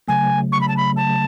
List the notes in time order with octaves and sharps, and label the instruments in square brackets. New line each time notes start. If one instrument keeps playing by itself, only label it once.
[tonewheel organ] C#3 F#3 A3 [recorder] G#5
[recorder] C#6
B5
A5
B5
A5